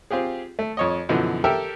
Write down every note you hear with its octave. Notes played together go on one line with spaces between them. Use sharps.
C4 F4 G4 G#4
A3
F2 C#5 D#5
F#2 B2 D3 E3 F3
G4 A4 A#4 E5 G5